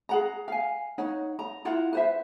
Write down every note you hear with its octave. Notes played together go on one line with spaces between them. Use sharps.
G#4 F#5 A#5
F5 G#5
D#4 C#5 F#5
A#5
E4 F4 F#5 A#5
B4 C5 E5